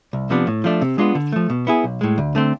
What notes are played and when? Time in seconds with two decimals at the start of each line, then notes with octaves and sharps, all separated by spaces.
0.13 C2
0.30 C3 F3 B3 D4
0.47 A2
0.64 F3 A3 D4
0.82 C3
0.98 G#3 B3 D4 F4
1.15 D3
1.33 F3 A3
1.50 B2
1.67 B3 E4 G#4
1.84 B1
2.01 A2 G#3
2.18 D2
2.35 D3 A3 C4